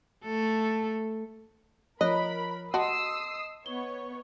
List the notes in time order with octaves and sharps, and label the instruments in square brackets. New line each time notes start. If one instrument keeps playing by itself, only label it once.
[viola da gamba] A3 A4
[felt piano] F3 [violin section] A#4 B5 [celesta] C#5 F#6 [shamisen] D#5
[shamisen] F#4 [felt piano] D#5 [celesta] A5 C6 [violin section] D#6 E6 C7
[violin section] B3 C#5 [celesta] G7